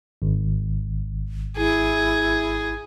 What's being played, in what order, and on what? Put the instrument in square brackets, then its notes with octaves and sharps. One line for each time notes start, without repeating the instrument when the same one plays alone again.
[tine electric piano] G#1
[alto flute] E4 [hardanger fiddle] G#4